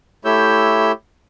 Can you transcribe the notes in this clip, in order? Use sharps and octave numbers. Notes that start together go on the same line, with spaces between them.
A3 E4 G4 C#5 E6 G6